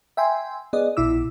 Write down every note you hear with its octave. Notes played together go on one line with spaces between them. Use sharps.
E5 G5 G#5 C6
B3 G#4 D5 D#5
A#1 B2 E4 D6 E6